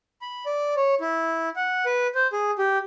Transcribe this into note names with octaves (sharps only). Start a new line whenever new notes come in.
B5
D5
C#5
E4
F#5
B4
C5
G#4
G4